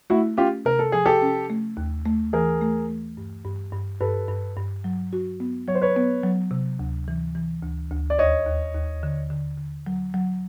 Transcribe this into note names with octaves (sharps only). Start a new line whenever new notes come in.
A3 E4 F#4
C#4 F4 G4
C3 A#4
A4
F3 G#4
G4 A4
C#4
A3
D#2
A3
E3 G#4 A#4
A3
A3
G2
G2
G2
G2 A4 B4
G2
G2
F#3
F#4
B3
F#3 C#5
C5
B4 C#5
B3
F#3
C3
D2
E3
E3
D2
D2
D5
D#2 C#5 D#5
D#2
D#2
D3
D3
D3
F#3
F#3